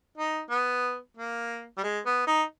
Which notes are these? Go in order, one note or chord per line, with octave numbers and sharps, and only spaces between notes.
D#4
B3
A#3
G3
G#3
B3
D#4